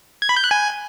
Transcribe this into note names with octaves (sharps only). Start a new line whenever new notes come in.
G#6
B5
G6
F#6
G#5